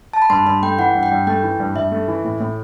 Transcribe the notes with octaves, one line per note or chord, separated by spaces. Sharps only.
A5
B5
G2 C6
G2 B5
A3 G5
E3 F#5
G2
G5
G2
A3 G5
E3
G2
G2 E5
A3
E3
A2
A2